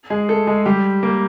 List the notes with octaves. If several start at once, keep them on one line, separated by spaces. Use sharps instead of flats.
G#3 G#4
A3 A4
G#3 G#4
G3 G4
A#3 A#4